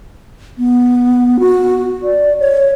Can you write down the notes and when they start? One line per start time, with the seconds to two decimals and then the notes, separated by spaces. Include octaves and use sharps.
0.58 B3
1.39 F#4
2.03 D5
2.40 C#5